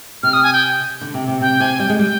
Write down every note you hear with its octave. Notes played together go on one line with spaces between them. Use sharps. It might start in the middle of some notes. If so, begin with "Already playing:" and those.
C3 F6
D#6
G#5
G5
D3
C3
C3
C3 G5
C3 G#5
G3 G5
G#3
G3 G5